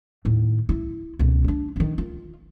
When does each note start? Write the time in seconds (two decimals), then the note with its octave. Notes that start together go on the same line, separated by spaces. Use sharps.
0.25 D#2 A2
0.69 E4
1.19 C#2 B2
1.44 C#4 D4
1.76 D#3 D4
1.98 F4